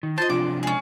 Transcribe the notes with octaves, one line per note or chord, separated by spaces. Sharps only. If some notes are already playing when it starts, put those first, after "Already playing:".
D#3
F4 C5 D#5 A5
C3 F3 D4 D6
G#3 C#4 G#4